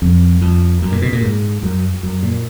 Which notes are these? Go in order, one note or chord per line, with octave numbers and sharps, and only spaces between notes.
F2
F2
F#2
A#2
B2
A#2
G#2
F#2
F#2
A#2